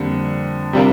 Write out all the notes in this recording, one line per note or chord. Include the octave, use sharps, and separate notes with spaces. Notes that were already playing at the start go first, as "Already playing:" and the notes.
Already playing: F2 D3 G3 A#3
C3 G3 D4 F4 A#4